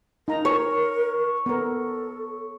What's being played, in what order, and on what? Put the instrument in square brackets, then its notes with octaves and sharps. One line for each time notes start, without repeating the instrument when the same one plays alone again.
[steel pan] D#4 A#5 [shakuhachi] A#4
[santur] C#5
[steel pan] B3 A#4 [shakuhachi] A4